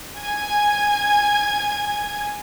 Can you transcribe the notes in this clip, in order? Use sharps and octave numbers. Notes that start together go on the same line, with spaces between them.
G#5 G#6